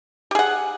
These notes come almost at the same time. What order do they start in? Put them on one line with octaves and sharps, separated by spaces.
G4 G#4 F#5